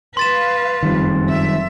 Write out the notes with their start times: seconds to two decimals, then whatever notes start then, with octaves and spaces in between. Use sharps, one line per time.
0.17 B4 F5 C6 A6 E7
0.83 F#1 F2 D#3 G3
1.28 F#2 E5